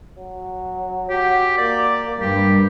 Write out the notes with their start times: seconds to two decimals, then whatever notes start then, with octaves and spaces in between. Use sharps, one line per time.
0.18 F#3
1.10 F#4 G4
1.58 A#3 D5
2.21 G2 G4